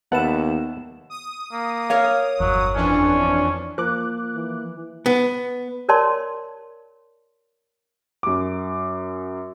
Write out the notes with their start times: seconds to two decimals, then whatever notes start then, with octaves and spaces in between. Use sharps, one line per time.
0.12 D#2 B3 B4 E5 F#5 A5 E7
1.10 D#6
1.53 A#3
1.90 A#4 C#5 F5
2.40 G1 E2 F#3
2.75 F2 E3 C#4 D4
3.78 F3 A#3 D6 F#6
4.35 E3
5.06 B3
5.89 A#4 C#5 D5 A5 C6
8.23 F#2 D6